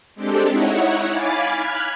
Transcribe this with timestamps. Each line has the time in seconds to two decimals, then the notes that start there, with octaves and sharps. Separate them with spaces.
0.15 G#3 C4 D4 G4 A4
0.49 D#4 E4 C#5 F#5
1.11 F5 G#5 B5 D6 G#6 A6
1.53 B5 F6 F#6 G#6